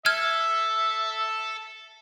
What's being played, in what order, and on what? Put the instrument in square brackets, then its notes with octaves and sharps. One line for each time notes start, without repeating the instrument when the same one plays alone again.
[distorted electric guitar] A4 [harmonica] E5 [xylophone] F6 G#6